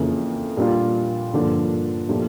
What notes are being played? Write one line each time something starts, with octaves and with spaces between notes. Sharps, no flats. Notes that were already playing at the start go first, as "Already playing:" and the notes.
Already playing: F2 C#3 E3 A#3
A#2 G3 A#3 D4 F4
G2 D3 F3 A#3 D4
A#2 F3 A3 D4 G4